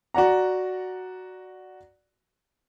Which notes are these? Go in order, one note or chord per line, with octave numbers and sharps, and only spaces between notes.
F#4 D5 F#5 A#5